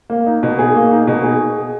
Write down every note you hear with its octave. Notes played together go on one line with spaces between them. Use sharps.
A#3
D#4
B2
G#4
A#3
D#4
B2
G#4